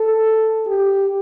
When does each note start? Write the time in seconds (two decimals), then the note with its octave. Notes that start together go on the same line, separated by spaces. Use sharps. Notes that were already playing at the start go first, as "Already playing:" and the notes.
Already playing: A4
0.67 G4